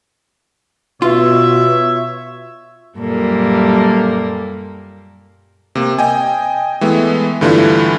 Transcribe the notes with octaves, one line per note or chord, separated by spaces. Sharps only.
B2 F4 C#5 E5
F#2 A#2 G3 A#3 A4
C3 A#3
D#5 G5 G#5
E3 G#3 A3 B3
G2 D3 E3 A3 E4 F4